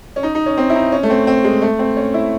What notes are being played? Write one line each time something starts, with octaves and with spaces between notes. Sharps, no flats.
C#4
D#4
D#4
C#4
C4
E4
D#4
C#4
A3
C4
C4
G#3
A3
C4
C#4
E4